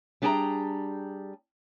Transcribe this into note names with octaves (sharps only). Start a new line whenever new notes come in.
G3 D4 G#4 G5 A5 A#5